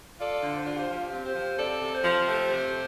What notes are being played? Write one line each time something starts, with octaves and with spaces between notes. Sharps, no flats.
F4 A4 D5
D3
C5
F4 D5
G4 C5
F3 G4
C4
G4 C5
F3
C3 A4 D5
C3
G4 C5
F3
A3 G4 C5
C3